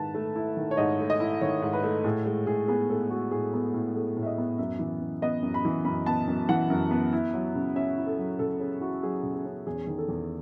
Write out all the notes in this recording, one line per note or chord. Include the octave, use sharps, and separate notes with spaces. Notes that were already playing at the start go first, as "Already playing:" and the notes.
Already playing: G#2 D#3 E4 B4 A5
A3
E4
D#3
C#5
G#2 D#5
A3
D#5
E4
D#3 C#5
G#2
B4
A3
A2 G#4
G#3
A2 G#4
B3 G#4
A2 A4
G#3 F#4
A2 G#4
B3
A2
G#3 A4
A2
E5
D#5
B3
F#2 E5
E3
F#2
B3 D#5
F#2
B5
E3
F#2 B5
B3 A5
F#2
E3 F#5
F#2
B3
E4
F#3
C#3
C#4 E5
E4
A4
F#3
C#3 A4
C#4 G#4
E4 F#4
F#3 G#4
C#3
G#4
C#4
E2 G#4
D#3
A4
E2